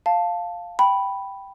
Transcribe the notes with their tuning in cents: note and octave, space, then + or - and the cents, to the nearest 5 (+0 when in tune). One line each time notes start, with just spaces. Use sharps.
F5 +0 A5 +0
G5 -5 B5 +0